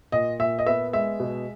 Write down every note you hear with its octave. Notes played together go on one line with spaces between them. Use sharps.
A#2 D#5
A#2 E5
D#5
B3 E5
G#3 E5
B2